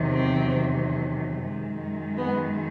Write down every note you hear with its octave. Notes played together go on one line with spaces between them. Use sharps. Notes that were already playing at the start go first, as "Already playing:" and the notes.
Already playing: E2 C3 D#3 F#3
C4
F#2 D#3 G#3
B3